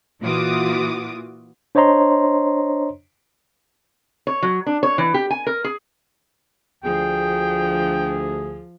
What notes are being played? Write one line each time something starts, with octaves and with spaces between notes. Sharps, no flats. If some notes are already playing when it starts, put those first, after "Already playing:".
A#2 E3 F4 F#4 D6 D#6
D4 C5 C#5 D#5 A#5 C6
C#5
F#3
D4
C#5
E3
G4
G#5
A#4
G#4
D2 F3 G#4 G5